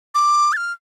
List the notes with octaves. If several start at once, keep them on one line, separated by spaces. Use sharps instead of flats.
D6
A6
F6